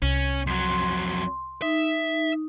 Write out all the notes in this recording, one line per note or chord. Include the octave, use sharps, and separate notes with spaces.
C2 C#4
F2 F#3 C6
D#4 E5